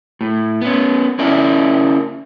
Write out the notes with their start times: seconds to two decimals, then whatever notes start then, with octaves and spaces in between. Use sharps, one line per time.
0.21 A2
0.61 B3 C#4
1.19 C#4 E4 A#4 D5 E5